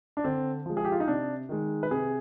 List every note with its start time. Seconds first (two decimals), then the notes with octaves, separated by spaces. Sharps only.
0.17 D4
0.24 D3 C4
0.66 F3 G#3
0.77 G#4
0.85 G4
0.92 F4
1.00 D#4
1.08 C3 D4
1.49 D#3 G#3
1.83 B4
1.91 C3 G#4